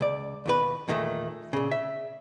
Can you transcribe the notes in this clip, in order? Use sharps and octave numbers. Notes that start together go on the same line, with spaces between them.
C#2 D5
D#2 B2 B4
E2 A#2 D#3 G#3 A3
A#2 C#3
E5